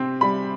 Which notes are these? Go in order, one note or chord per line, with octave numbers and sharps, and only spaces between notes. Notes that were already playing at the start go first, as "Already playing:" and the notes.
Already playing: C3 C4
G3 B5